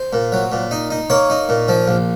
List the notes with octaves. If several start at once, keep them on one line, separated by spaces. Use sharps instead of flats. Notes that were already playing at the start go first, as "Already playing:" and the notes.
Already playing: C5
A#2
F#3
A#2
D#4
D#4
A#3 C#5
D#4
A#2
F3
A#1